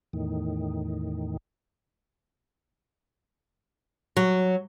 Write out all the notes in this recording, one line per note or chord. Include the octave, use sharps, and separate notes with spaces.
E2 A2 D#3
F#3